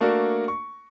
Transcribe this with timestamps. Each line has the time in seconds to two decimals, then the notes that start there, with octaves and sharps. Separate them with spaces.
0.01 A3 A#3 D4 F#4 A#4
0.48 C#6